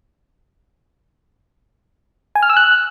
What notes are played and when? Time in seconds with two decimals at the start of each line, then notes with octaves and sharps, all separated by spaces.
2.35 G#5
2.43 F6
2.50 E6
2.57 F#6